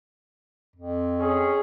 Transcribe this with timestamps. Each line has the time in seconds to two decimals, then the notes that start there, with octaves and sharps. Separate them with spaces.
0.76 F2
1.20 C#4 G#4